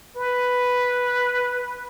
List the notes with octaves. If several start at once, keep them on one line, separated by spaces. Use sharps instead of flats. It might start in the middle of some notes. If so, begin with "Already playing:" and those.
B4